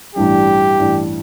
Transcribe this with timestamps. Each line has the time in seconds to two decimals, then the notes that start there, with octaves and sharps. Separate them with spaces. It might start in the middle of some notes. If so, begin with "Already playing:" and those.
0.15 A1 G2 E3 G3 D4 G4
0.79 A1 G2 E3 G3 D4